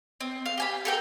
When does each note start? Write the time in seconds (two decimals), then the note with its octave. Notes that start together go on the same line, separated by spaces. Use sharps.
0.21 C4
0.46 F5
0.57 G4 G#5 B5
0.85 A4 A#4 G5